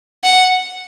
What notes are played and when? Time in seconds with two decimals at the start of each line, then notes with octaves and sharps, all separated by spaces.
0.24 F#5